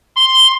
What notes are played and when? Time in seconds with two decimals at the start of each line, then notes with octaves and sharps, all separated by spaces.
0.16 C6